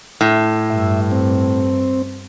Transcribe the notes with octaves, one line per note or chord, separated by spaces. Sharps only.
A2
G2 E5
C4